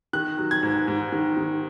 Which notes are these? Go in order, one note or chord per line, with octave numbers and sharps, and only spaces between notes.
D#3 F#6
F#3
G#6
G#2
G#2
D#3
D#3